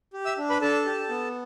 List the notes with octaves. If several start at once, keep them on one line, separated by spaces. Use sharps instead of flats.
G4
E5 E6
D4
B4 B5
D4 A4 A5
G4
B3